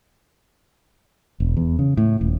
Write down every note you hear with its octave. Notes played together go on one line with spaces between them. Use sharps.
E1
E2
C#3
A2
D#1